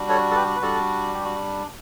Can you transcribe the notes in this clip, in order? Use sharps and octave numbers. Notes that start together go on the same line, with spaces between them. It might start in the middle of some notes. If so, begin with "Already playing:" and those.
Already playing: G3 D4 F#4
A4 C#5
A4
G4 B4
B4
G3 D4 F#4 A4
G4
F#4